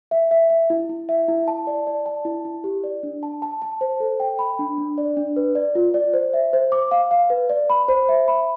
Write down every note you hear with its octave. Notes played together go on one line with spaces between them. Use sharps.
E5
E5
E5
E4
E4
E5
E4
A5
D5
D5
A5
E4
E4
G4
D5
D4
A5
A5
A5
C5
A4
G5
B5
D4
D4
D5
D4
B4
D5
F4
D5
C5
E5
C5
D6
F5
F5
B4
D5
B5
C5
E5
B5